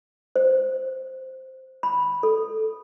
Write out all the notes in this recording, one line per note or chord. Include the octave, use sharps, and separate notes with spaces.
C5
B5
A4